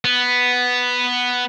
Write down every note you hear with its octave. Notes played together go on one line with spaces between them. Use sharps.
B3